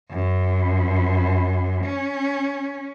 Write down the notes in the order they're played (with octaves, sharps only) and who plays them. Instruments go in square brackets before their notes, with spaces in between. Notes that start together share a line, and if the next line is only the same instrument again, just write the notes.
[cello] F#2
C#4